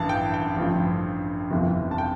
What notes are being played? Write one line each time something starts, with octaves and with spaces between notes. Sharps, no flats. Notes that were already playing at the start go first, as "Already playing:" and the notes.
Already playing: A1 G2 E3 A5
G5
G5
A1 G2 D3 F3
G1 F2 C3 E3
A5
G5